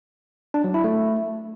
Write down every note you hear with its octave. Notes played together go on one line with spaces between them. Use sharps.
D4
F#3
E4
A3